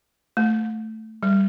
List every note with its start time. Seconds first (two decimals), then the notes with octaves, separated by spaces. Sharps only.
0.37 A3
1.23 G3